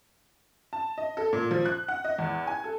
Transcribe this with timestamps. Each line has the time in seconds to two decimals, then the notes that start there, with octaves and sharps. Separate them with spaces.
0.73 A5
0.98 D#5
1.17 A4
1.33 A#2
1.51 F3
1.66 F#6
1.88 F#5
2.04 D#5
2.18 E2
2.47 G#5
2.64 A4